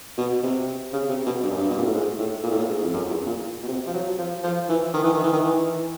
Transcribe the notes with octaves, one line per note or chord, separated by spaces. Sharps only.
B2
C3
C#3
C3
B2
G2
F#2
G2
B2
A#2
A2
G#2
A2
A#2
A2
A#2
G#2
F2
F#2
E2
A#2
B2
C3
F3
F#3
F3
F3
E3
D#3
E3
D#3
E3
D#3
E3